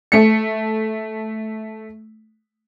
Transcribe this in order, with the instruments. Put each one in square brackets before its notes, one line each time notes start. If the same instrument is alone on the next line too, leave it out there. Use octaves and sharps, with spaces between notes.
[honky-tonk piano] A3 C#7